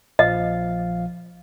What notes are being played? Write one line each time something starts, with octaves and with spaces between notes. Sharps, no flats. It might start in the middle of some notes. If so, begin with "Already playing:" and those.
A#1 F3 D#5 F5